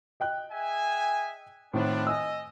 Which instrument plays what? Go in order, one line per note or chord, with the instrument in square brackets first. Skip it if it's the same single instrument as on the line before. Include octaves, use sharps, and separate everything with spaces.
[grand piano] D#5 G5 F#6
[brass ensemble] G#4 E5 G#5
[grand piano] A2 D#3 C4 [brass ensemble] B3 D4 F4
[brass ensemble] D#5 [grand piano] G#5 E6